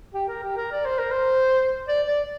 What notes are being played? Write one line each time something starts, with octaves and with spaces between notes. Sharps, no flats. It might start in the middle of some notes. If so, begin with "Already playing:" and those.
G4
A#4
G4
A#4
D5
C5
A#4
C5
D5
D5